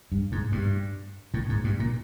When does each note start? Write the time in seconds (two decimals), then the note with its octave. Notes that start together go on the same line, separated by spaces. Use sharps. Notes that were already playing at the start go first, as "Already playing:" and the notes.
0.12 G2
0.32 G#2
0.52 G2
1.34 A2
1.49 G#2
1.64 G2
1.80 A#2